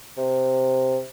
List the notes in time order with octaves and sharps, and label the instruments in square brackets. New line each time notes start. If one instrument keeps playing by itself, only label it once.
[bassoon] C3